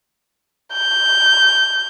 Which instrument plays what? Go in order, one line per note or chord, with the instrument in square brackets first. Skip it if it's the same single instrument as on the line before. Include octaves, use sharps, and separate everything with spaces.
[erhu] G6